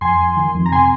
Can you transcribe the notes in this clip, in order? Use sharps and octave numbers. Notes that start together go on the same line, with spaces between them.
F2 G#5 C6
F2
D#3
F2
A#5
C3 G#5 C6